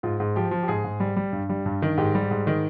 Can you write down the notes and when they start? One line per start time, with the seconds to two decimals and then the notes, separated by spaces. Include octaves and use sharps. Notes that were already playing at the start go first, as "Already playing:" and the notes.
0.03 G#2 F4
0.20 G#2
0.36 F3 G4
0.51 F3
0.63 G4
0.68 G#2 G#4
0.84 G#2
1.00 G3
1.16 G3
1.33 G2
1.49 G3
1.66 G2
1.82 D#3
1.98 G#2 G4
2.15 G3
2.31 G#2
2.47 D#3